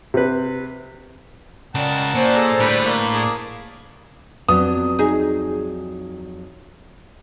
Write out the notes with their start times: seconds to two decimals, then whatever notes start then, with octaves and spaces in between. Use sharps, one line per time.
0.14 C3 B4
1.75 C#2 C#3 A#4 D5 F#5 G5 A5
2.15 A#2 C#4 C5 D5 F#6
2.35 G#4 A4 A#5
2.60 A2 D3 G3 B4
2.84 A#3
3.14 D4 G#4
4.49 F2 F#3 B3 D4 D#6
4.99 D#4 G#4